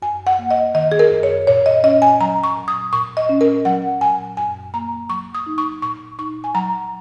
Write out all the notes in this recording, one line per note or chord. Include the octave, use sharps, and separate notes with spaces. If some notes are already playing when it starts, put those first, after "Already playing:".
F#2 G#5
F#5
A#3
D#5
D#3 D#5
G#4
A#4
F#2
C#5
A#2 C#5
D#5
C#4 D#5
G#5
F#3 A#5
C#6
A#2
D#6
A#2 C#6
D#5
C#4
A#4
F#3 F#5
A#2 G#5
F#2 G#5
A#3 A#5
F#3 C#6
D#6
D#4
C#6
A#2 C#6
D#4 C#6
G#5
F#3 A#5